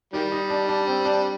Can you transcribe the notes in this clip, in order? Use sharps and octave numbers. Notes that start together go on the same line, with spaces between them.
D#3 G3 G4
D#4
D4
D4
C4
D4